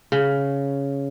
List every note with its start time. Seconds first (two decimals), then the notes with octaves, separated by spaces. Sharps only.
0.12 C#3